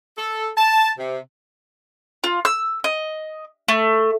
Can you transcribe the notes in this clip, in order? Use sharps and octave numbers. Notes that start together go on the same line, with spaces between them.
A4
A5
C3
F4
E6
D#5
A3